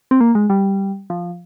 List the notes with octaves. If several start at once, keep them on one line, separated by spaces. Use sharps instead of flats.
C4
A#3
G#3
G3
F3